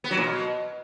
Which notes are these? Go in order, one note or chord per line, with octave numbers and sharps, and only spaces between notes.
B3
F#3
A#2
B2